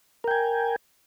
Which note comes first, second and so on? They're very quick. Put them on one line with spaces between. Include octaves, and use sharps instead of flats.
A#4 G5 G#5